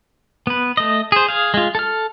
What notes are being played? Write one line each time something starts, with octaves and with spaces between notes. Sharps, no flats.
B3 B4
A3 D#5
G#4 C5
G#4 F5
G#3 F4
A4 F6